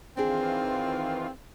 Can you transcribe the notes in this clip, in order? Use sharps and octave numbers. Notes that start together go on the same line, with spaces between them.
D#3 E3 C4 D4 F4 G#4